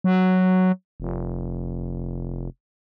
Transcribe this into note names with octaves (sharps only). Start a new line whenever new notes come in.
F#3
F1